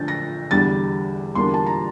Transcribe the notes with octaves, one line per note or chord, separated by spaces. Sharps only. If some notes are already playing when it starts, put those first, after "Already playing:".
Already playing: D3 F3 A3 D4 G6 A6
A#6
E2 D3 G3 A6
E2 D3 G3 A#3 D4 C6
A5
A#5